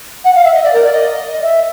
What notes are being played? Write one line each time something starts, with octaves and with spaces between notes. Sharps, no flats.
F#5
F5
E5
D#5
D5
A#4
D5
D#5
E5